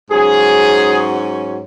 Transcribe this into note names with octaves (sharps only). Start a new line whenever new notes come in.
G#2 F#3 C#4 G#4